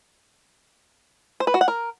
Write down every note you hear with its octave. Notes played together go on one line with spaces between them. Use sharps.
C5
B4
F#4
F#5
A#4